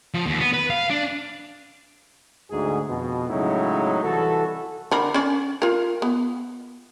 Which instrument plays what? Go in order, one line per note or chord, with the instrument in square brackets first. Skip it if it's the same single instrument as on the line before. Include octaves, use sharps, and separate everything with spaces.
[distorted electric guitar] F3
D#2
B3
B4
F5
D4
[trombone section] D2 G#2 G#4
F2 B2
A2 C#3 F#3 G#3 D#4 E4
C2 E3 F#4 A4
[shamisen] D3 A#4 B5
C#4 D5
F4 A#4
B3